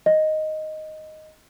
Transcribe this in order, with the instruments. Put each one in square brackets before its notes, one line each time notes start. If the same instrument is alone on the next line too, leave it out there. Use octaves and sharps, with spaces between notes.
[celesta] D#5